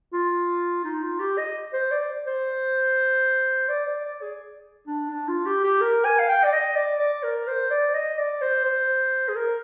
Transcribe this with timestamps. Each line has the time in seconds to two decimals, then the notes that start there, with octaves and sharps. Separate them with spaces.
0.13 F4
0.84 D#4
1.02 F4
1.20 G4
1.38 D#5
1.73 C5
1.91 D5
2.27 C5
3.69 D5
3.86 D5
4.04 D5
4.22 G#4
4.87 D4
5.11 D4
5.28 F4
5.46 G4
5.64 G4
5.81 A#4
6.05 G#5
6.19 F5
6.29 G5
6.44 D5
6.53 D#5
6.76 D5
6.99 D5
7.23 A#4
7.47 C5
7.70 D5
7.94 D#5
8.18 D5
8.41 C5
8.65 C5
9.29 G#4
9.36 A#4